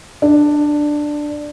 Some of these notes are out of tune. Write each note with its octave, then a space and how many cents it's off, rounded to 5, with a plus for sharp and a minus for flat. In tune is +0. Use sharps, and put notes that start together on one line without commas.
D4 +10